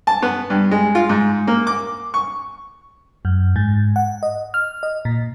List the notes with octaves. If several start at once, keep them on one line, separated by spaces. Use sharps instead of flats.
A5
B3
G2
G#3
F4
G#2
A#3
D6
C#6
F#2
G#2
F#5
D#5
F6
D#5
A#2